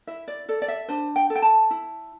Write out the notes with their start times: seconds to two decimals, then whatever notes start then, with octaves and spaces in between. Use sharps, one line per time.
0.07 E4 E5
0.28 D5
0.49 A4 D5
0.62 D5
0.68 E5
0.88 D4 C5
1.16 G5
1.30 A4
1.35 G5
1.42 A5
1.71 E4